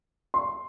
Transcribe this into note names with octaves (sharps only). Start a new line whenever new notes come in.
C6